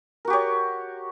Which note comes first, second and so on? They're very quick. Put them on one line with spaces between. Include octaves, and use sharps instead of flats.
A#4 F#4 G4 C#5